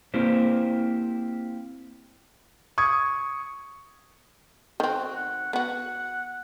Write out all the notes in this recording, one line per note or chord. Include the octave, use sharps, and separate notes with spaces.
A#3 C4 E4 G4 C5
C#6 D#6 G#6
D#3 C4 F#4
F#5
B3 F#4 F#5